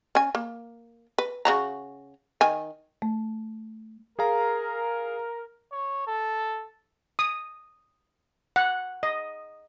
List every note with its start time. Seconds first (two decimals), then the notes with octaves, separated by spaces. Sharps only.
0.15 C#4 G#5
0.35 A#3
1.18 B4
1.45 C#3 F#4 A#5
2.41 D#3 G#5
3.02 A3
4.19 G#4 A#4 F5 A#5
5.72 C#5
6.07 A4
7.19 D#6
8.56 F#5
9.03 D#5